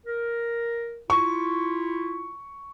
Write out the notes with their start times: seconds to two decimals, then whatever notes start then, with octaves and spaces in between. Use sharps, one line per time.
0.05 A#4
1.10 E4 F4 C#6